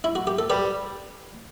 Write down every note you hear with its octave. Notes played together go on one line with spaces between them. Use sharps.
E4
F#4
G4
A4
G3 G4 B4